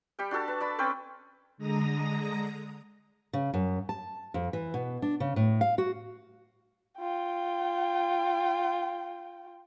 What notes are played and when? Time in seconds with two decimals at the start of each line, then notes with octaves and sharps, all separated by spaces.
0.19 G3 G4 G5
0.31 D4 F#4 A4 A5
0.48 B4
0.60 D5 A5 B5
0.79 C4 C#4 B4 G5
1.58 D3 G#3 A#5 D#6 A#6
3.33 C#3
3.54 F#2
3.89 A5
4.34 F2
4.53 E3
4.74 B2
5.02 D4
5.20 C#3
5.36 A2
5.61 F5
5.78 F#4
6.99 F4 G5